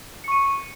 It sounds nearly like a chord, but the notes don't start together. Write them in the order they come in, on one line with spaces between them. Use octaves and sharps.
C#7 C#6 D#7